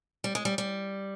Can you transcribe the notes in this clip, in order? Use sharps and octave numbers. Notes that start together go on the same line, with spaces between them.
G3
G#3
G3
G3